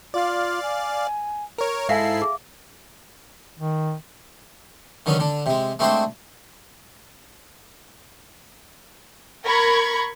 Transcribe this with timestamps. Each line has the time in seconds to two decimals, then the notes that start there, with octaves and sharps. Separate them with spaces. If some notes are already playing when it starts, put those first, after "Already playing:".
0.14 F4 D5 F5
0.63 G#5
1.58 A#4 C#5
1.89 G#2 E4 A4 E5 F5 G#5 C7
2.22 G#4
3.59 D#3
5.06 D3 D#3 F#3 B3 C#4
5.19 D3 D4
5.46 C3 G#3
5.79 G#3 A3 C4 D4 F#4 C5
9.44 A#4 B5 C#6 G#6